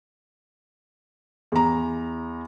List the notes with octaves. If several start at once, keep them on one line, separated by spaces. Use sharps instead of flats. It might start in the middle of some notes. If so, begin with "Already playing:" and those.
E2 A#5